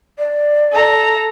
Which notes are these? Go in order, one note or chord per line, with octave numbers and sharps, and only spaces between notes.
D5
A4 A#5